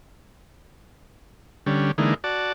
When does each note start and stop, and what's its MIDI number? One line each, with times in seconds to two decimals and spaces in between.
1.66 1.91 50
1.66 1.91 55
1.66 1.91 61
1.98 2.14 50
1.98 2.14 52
1.98 2.14 56
1.98 2.14 58
1.98 2.14 63
2.24 2.52 66
2.24 2.52 74
2.24 2.52 81